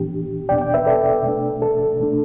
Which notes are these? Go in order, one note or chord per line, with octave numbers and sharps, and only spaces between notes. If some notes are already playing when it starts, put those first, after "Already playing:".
Already playing: A2 E3 B3 D4 G4
E2 B2 B3 D4 D5 G5
D5 G5
B4 E5
A4 D5
B2 A3 D4
A4
B2 A3 D4